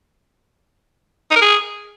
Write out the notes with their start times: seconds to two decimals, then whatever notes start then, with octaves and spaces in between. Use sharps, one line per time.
1.31 D#4
1.36 A#4
1.41 G#4